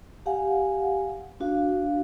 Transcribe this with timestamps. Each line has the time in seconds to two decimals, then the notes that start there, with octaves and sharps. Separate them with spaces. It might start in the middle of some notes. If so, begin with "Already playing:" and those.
0.26 G4 F5 F#5 G#5
1.40 D4 F#4 F5